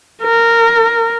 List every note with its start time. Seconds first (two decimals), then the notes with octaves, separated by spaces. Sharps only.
0.22 A#4